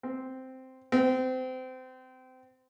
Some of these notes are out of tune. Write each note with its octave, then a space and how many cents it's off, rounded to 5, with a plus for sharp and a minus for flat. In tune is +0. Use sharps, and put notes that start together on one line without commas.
C4 -5
C4 -25